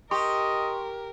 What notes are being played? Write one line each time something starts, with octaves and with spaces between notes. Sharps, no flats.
G4 A#4 D#5 C6 C#6